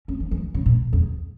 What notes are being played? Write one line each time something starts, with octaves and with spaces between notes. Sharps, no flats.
C#4
E3
E3
C#3
A#2
E2